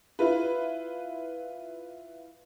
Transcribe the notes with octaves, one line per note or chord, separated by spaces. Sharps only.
E4 F4 B4